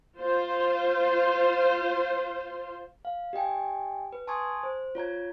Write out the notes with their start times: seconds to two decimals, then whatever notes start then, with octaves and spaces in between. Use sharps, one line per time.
0.18 F4 C5
3.05 F5
3.33 G4 D#5 G5 G#5
4.12 B4
4.27 G#5 A5 C6 C#6 D#6 G#6
4.63 C5
4.95 F4 C#5 A#5 G#6